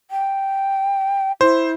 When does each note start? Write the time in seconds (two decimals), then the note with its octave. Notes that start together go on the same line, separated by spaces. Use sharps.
0.11 G5
1.41 E4 C5